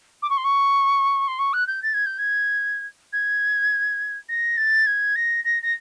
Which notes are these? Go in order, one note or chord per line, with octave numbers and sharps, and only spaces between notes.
D6
C#6
C6
C#6
C6
C#6
F#6
G6
A6
G#6
G6
G#6
G#6
A#6
A6
G#6
A#6
A#6
A#6